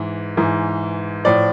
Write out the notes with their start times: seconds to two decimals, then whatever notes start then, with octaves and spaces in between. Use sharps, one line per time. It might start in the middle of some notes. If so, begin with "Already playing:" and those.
Already playing: G#2 E3
0.37 G#2 E3
1.25 A2 F3 D5